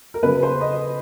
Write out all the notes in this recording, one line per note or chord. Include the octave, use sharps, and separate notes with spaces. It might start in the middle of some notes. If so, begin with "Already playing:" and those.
A#4
C#3 F#3 B4
C5
D#5